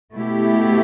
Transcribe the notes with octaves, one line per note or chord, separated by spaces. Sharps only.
B2 A3 E4 G4